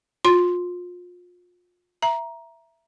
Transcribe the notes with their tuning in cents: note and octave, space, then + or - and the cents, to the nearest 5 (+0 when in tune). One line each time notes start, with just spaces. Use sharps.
F4 +30 C6 +0
E5 +10 A#5 +10